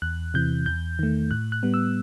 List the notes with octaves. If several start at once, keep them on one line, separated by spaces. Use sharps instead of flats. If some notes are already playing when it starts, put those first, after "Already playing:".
E2 F#6
C3 E3 G6
E2 G6
D#3 A3
A2 F#6
F#6
G3 B3
E6